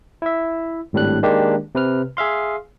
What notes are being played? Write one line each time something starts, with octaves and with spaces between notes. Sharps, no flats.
E4 E5
G#1 A2 G3 D4 F#6
D#3 G#3 A#3 D4 D#4 G4
C3 B4 F6
G#4 E5 F5 C6